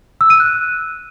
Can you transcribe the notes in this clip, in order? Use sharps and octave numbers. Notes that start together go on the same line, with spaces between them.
E6
D#7
F#6